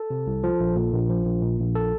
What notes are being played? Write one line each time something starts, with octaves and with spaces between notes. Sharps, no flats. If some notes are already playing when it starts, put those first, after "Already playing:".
Already playing: A4
C3
C2
F3
A#1
A#2
A#1
F3
A#1
A#2
A#1
A4